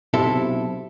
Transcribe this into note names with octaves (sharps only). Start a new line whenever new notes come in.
B1 C3 E4 A4